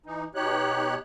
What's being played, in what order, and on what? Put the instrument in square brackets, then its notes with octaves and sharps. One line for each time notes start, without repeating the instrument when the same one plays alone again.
[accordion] E3 D#4
B2 D#4 G4 C#5 F#6